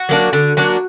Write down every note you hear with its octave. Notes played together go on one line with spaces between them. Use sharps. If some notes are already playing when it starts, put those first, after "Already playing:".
Already playing: F#4
F#3 A#3 D4
D3
F#3 A#3 D4